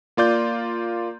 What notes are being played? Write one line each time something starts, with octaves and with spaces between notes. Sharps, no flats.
A#3 F4 D5 G6